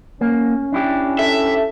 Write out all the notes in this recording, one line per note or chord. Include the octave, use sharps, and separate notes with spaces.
A#3 C#4
D4 E4 G4
A4 E5